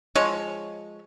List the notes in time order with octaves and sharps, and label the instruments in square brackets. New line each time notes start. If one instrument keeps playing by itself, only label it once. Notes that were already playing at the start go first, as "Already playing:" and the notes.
[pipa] F3 G#3 F4 C#5